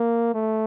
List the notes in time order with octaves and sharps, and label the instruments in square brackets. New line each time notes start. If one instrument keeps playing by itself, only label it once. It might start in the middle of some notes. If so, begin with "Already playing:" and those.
Already playing: [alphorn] A#3
A3